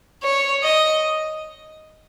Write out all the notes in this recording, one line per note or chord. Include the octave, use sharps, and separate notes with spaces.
C#5
D#5